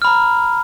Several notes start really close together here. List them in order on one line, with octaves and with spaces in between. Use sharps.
F6 B5 A#5